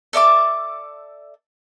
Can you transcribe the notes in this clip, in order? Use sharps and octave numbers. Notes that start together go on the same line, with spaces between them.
A4 D5 E5 D6